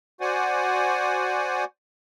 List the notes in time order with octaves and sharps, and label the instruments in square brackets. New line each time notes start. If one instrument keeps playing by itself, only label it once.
[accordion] F#4 C5 D5 F#5 G#5